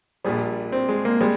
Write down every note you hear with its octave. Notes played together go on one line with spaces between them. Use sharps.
A#1 A#2 G3 G#4
C4
G#3
A#3
G3 G#3